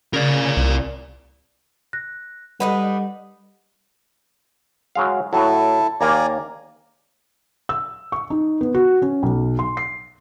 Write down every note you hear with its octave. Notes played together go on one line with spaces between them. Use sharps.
C#3 A#4 D5
C2
F#6 A#6
G3 D4 D#4 A4 B4 F#5
F#3 G#3 F5
A2 F#3 E4 A4
D#2 A#3 D5 G#5 A#5
E6
C#6
D#4
B3
F#4
C#4
B1
C6
C7